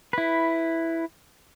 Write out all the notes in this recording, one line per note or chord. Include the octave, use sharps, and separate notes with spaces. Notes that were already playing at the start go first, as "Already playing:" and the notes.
E4 B4